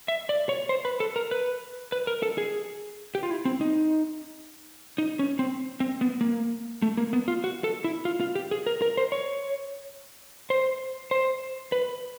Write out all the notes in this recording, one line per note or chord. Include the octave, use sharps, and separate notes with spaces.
E5
D5
C#5
C5
B4
A4
A#4
B4
B4
A#4
A4
G#4
G4
F4
E4
C4
D#4
D#4
C#4
C4
C4
B3
A#3
A3
A#3
B3
F4
F#4
A4
E4
F4
F4
G4
G#4
A#4
A#4
C5
C#5
C5
C5
B4